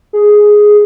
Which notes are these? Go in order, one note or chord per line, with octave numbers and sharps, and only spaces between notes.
G#4